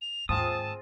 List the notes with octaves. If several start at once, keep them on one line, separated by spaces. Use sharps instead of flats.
F7
D#2 G#2 C4 F4 G#4 A5 D#6